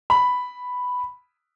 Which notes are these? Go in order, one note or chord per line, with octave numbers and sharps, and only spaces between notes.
B5